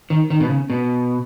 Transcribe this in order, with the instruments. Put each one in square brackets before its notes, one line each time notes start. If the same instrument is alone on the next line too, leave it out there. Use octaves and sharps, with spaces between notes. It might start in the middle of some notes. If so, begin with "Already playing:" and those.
[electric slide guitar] D#3
D#3
B2
C#3
B2